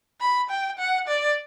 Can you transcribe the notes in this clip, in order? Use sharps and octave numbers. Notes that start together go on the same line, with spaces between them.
B5
G5
F#5
D5